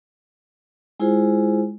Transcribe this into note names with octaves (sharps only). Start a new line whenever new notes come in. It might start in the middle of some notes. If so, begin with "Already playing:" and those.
G#3 E4 F4 G#4 C5